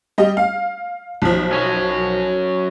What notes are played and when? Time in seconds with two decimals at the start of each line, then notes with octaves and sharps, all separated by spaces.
0.18 G3 D#5
0.37 F5
1.22 B1 F3
1.52 F#3 C#4